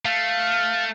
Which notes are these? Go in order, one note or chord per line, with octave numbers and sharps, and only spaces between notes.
A3 F5